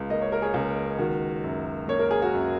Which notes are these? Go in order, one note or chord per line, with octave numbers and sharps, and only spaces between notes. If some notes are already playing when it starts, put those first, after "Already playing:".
Already playing: C#2 C#3
A#3 D#5
C#5
A#4
G#4 C#5
C#2
D#3 F#4
F#2
A#3 C#5
A#4
G#4
F#4 A#4
F#2